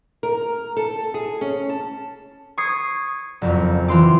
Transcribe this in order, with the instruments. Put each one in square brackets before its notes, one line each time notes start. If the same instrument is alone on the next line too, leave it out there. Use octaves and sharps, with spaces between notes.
[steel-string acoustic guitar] A#4
A4
G#4
C#4
A5
[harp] C#6 D#6 G#6 C7
F#1 F2
E3 F4 C6 D6